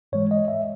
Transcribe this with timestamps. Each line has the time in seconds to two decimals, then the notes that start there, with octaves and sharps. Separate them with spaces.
0.12 G#2 E3 G#3 C#5
0.31 D#5
0.48 E5